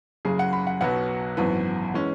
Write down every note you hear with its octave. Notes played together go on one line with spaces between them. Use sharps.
F#1 F#2 C#3 G#4
F#5
B5
F#5
B1 B2 F#3 B3 F#5
G#1 F#2 E3 B3
E3 G#3 C#4